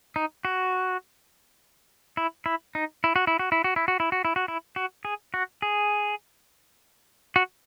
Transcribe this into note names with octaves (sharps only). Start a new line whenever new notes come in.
D#4
F#4
E4
E4
D#4
E4
F#4
E4
F#4
E4
F#4
E4
F#4
E4
F#4
E4
F#4
E4
F#4
G#4
F#4
G#4
F#4